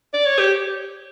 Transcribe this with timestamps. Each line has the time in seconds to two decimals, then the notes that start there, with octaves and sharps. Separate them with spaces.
0.13 D5
0.26 C#5
0.39 G4